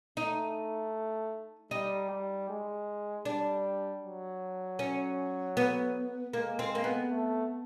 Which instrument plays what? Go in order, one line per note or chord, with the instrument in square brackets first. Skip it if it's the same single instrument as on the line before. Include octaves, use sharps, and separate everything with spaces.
[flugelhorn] A3 [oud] D#4
[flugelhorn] G3 [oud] D#4
[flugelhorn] G3
G#3
[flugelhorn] G3 [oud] D4
[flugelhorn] F#3
[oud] C#4
B3
[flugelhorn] G#3 [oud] A#3
[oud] C4
A#3
B3
[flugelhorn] A3